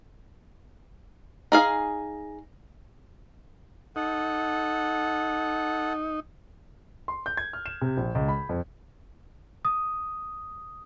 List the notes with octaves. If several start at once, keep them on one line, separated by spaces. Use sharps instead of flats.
D#4 G#4 F5
D#4 A4 F#5
C6
G6
G#6
F6
E7
C3
A#1
C#2
B5
F2
D#6